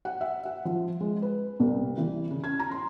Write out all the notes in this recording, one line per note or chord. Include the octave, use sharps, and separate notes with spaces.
F#5
E5
F#5
F3
G#3
B4
C2
E3
C#3
G#6
A#5
C6